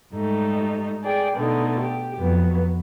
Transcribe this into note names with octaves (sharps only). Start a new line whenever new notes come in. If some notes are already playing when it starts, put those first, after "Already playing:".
G#2 G3 A3 D#4
G#4 D5 G5
B2 D3 A3 D#4
G4
F2 F#3 B3